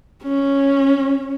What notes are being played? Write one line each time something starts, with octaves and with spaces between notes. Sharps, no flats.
C#4